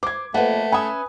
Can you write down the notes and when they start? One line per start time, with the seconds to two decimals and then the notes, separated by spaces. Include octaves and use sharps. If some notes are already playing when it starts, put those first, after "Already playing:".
0.03 C5 D6 G#6
0.34 F2 A3 A#3 B4 F#5
0.72 C#4 B4 E5 G#5 D#6